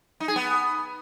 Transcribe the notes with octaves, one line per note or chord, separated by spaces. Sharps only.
D#4
G#4
B3